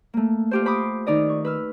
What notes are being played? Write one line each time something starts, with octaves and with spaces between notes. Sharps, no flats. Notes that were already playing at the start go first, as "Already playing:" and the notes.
A3 A#3
F4 G4 C5
C5 B5 D6 D#6
D#3 D#4 D5 D#5
C#6
B4 E6 F6